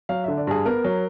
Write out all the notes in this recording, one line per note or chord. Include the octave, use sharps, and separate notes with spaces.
F#3 F5
D3 E5
D5
G2 G#4
B3 A#4
F#3